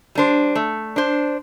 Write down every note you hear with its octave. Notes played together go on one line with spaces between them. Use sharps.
G3 D4 C5
A3
D4 C5